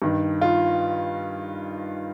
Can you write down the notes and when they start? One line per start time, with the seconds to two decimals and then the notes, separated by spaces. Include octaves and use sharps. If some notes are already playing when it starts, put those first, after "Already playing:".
0.02 G2 D#3
0.41 F4